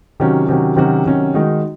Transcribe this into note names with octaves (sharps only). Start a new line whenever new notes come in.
C3 D#3 F#3 C#4 F#4
C3 D#3 F#3 C#4 F#4
C3 D#3 F#3 C#4 F#4
C3 D#3 F#3 C#4 F#4
D#3 G#3 D#4 F#4